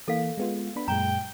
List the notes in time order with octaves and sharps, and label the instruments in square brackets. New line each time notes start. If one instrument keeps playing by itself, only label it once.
[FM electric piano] E3 A#3 [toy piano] A4 F5
[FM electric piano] G#3 B3 F4
B3 D4 B5
[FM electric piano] F#2 A#2 G#3 [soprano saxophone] G5 [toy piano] A#5